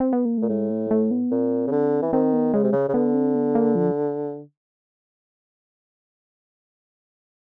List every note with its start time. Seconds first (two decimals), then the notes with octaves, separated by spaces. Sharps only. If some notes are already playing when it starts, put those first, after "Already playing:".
0.00 C4
0.13 B3
0.25 A#3
0.38 A#2 A3
0.49 A2 G#3
0.70 A3
0.91 A3
1.11 B3
1.31 A#2 C4
1.67 C#3
1.72 D3
2.02 E3
2.13 D#3 C4
2.33 B3
2.54 C#3 G#3
2.63 C3
2.72 C#3
2.89 C#3
2.94 D3 B3
3.14 C4
3.35 B3
3.55 A#3
3.75 F3